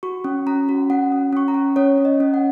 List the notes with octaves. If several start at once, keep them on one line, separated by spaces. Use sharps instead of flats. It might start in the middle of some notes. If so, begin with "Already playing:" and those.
F#4 C#6
C#4
C#4 A#5
F#4
C#4 F#5
C#4
C#4 C#6
A#5
C#4
C#4 C#5
C#4
D#5
C#4
F#5